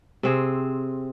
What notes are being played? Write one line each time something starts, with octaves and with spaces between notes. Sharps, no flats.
C3 C4 G#4